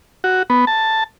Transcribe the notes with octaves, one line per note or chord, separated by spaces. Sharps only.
F#4
B3
A5